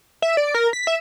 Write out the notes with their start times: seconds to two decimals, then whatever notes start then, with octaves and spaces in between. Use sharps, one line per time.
0.22 E5
0.37 D5
0.54 A#4
0.73 B6
0.87 E5